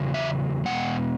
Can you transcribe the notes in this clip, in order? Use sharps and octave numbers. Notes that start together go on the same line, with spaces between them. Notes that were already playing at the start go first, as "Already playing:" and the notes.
Already playing: E2 C#3 F#3
E5
E2 B2 G#3 F#5